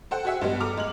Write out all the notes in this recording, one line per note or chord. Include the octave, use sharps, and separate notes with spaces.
A4 C5 F#5 G5
F#4 G#4 E5 F#5
G2 G3 G#3 B3
A4 A#5 D6 F6
G#3 F#7